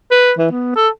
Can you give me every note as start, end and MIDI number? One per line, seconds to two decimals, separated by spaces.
0.11 0.32 71
0.38 0.48 52
0.51 0.71 59
0.75 0.89 69